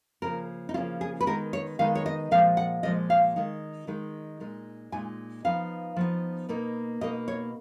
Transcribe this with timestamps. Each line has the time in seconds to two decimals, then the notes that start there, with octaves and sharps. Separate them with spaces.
0.22 C#3 F3 A#3 C#4 A#4
0.69 D#4
0.74 C#3 F3 A#3 C#4 F4
1.01 G#4
1.21 B4
1.26 D#3 G#3 B3 D#4 A#4
1.53 C#5
1.79 D#3 G#3 B3 D#4 F5
1.95 C#5
2.06 D#5
2.31 A#2 F3 G#3 F5
2.57 F#5
2.83 A#2 F3 G#3 D#5
3.10 F5
3.36 D#3 G#3 D#4
3.87 D#3 G#3 D#4
4.40 A#2 G#3 D#4
4.92 A#2 G#3 D#4 G#5
5.44 F3 B3 D#4 F5
5.96 F3 B3 D#4
6.49 B2 A#3 D#4
7.01 B2 A#3 D#4 D#5
7.28 C#5